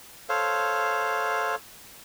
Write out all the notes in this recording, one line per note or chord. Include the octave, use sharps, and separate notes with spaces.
A4 C5 C#5 F5